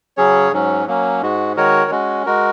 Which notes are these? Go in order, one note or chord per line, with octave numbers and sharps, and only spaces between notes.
C#3 F#3 C#4 G#4 C#5
G#2 F#3 C#4
F#3 A#3 C#4
G#2 G#3 F#4
D#3 G#3 F#4 A#4 C#5
G#3 C#4 F#4
G#3 F#4 A#4